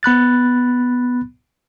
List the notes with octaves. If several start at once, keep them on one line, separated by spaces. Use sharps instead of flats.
B3 B5 F#6 A6